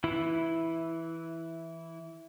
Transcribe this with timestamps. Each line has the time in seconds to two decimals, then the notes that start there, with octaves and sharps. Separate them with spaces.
0.04 E3 E4